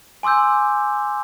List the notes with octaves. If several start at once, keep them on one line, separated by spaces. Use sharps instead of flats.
G#5 C6 D6 E6 G6